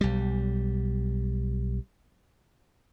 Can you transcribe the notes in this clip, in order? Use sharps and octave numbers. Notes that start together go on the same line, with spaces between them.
B1 G3